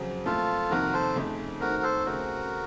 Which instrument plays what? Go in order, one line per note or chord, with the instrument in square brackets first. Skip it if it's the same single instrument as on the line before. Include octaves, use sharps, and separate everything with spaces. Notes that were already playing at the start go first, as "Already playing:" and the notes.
Already playing: [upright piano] F2 C#3 F#3 C4
[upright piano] A#2 F3 A3 C4 [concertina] F4 A4
[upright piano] F2 C3 D#3 [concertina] F#4 A#4
[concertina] A4 C5
[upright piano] F2 C#3 A3 D#4
[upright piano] D#3 A3 C4 [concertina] F#4 A#4
[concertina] A4 C5
[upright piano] C#3 A3 C4 [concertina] F#4 A#4